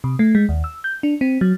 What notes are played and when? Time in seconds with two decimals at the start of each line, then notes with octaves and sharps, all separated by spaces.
0.04 C3
0.19 A3
0.35 G#3
0.49 D#2
0.64 E6
0.84 G6
1.03 D4
1.21 C4
1.41 F#3